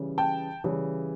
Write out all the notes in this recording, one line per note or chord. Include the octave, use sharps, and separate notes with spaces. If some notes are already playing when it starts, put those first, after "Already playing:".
Already playing: C#3 E3 G3
G5 A5
C#3 E3 G3